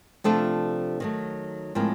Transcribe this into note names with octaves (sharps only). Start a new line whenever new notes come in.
C3 F3 A3 D4 F4 A4
D#3 F#3 A3
A2 F3 G#3 C4 A#4